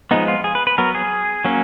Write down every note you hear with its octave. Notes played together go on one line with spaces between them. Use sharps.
F3 G#3 B3 D#4
F4
G#4
B4
B4
F#3 B3 A#4
G#4
F#3 A#3 C#4